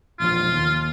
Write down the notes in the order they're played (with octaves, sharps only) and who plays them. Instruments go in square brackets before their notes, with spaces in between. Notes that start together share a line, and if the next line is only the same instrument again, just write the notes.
[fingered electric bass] E1 A#1 F3 [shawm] F4
[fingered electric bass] D#2